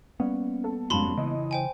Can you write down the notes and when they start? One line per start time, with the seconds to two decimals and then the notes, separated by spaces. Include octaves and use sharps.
0.20 G3 A#3 B3 C#4
0.64 A4
0.90 F1 G#2 F#3 C#4 F5 A5 B5 C6
1.17 C#3 E3 E4 D#5
1.51 C5 G5 G#5